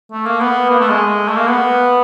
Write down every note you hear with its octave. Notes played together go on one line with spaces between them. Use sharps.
A3
A#3
B3
A#3
A3
G#3
A3
A#3
B3